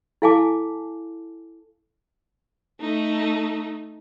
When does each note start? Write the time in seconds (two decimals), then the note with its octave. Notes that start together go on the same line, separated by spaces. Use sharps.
0.22 E4 A4 F5 G#5 A5 D6
2.80 A3 D#4